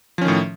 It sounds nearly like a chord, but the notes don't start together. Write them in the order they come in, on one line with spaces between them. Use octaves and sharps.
F3 C#4 D#3 A2